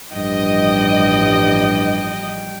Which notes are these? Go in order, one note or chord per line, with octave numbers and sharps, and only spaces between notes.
A1 G2 F3 G3 D#5 G5